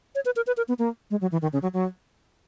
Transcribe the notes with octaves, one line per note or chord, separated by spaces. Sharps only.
C#5
B4
A#4
B4
A#4
B3
A#3
G#3
F#3
E3
D#3
C#3
F#3
F#3